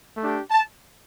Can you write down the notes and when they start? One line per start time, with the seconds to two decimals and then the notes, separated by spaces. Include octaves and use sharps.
0.17 A3 D4 G4
0.51 A5